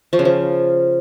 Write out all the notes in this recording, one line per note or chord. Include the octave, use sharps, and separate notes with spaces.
F3
C#3
F3